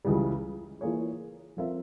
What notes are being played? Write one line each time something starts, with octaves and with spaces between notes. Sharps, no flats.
C#2 C#3 E3 G3
E3 A#3 F4 G#4 C#5
F3 C4 F4 A#4 E5